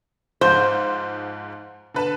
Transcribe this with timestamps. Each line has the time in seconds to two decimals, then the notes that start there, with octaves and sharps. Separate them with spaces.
0.41 G#2 F3 C5
1.94 D3 B4 A5